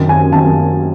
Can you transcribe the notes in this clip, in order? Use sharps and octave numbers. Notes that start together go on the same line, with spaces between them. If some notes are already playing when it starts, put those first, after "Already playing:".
Already playing: F#2 D#3
G#5
D#3 A5
F#2